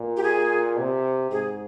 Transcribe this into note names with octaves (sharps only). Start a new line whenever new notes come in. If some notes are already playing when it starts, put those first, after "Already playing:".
Already playing: A#2
G4
G#4
C3
G#2 G#4